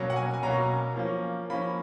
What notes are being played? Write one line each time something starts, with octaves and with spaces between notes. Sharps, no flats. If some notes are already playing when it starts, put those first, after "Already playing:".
Already playing: B2 F#3 A#3 C#4
F#5
G#5
G#5
B2 F#3 A#3 C#4 A#5
F3 A#3 C#4
F3 A#3 C#4 B5